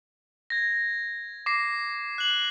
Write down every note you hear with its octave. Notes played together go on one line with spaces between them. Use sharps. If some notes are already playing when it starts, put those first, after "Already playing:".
G#6 A#6
D6 A#6 C7
F#6 F#7